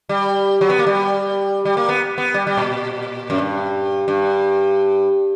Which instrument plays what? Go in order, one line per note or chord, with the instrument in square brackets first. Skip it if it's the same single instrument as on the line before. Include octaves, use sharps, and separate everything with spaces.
[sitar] G3
F#3
B3
A#3
G3
G3
A#3
B3
B3
G3
G3
A#2
F#2
G2
G2